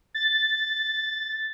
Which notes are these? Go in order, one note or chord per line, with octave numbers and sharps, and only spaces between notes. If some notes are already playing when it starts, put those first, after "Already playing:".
A6